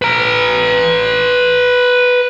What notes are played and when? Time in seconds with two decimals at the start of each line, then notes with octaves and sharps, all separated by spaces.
0.02 B4 A#5